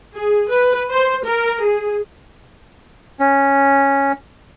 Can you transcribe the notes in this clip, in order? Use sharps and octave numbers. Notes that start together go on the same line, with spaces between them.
G#4
B4
C5
A#4
G#4
C#4